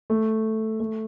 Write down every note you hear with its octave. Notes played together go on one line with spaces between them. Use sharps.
A3
A3